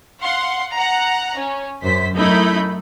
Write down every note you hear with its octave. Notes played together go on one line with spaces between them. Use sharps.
F5 F#5 C6
F#5 A#5
C#4
F#2 C5 B6
F#2 A3 D#4 E4 B5 G6